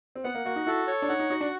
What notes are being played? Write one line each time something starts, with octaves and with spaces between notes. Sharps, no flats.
C4
B3 F#5
A#3
A#3 F#4
D#4
E4 A4
C#5
D4
D#4 F#5
D#4
D#4 F#4
D4